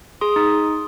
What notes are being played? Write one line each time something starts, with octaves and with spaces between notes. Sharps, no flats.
G#4 C6 D#6
D#4